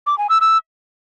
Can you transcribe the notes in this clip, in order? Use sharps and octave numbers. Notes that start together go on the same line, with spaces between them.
D6
G#5
E6
E6